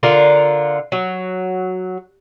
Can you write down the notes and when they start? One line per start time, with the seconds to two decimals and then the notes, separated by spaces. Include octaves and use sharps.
0.03 D3 F4 A#4
0.92 F#3